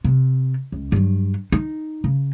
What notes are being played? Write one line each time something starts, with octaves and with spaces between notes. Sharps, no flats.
C3
C#2
G2 F#3
D#4
C#3